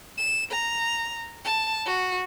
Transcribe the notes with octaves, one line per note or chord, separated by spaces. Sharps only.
E7
A#5
A5
F#4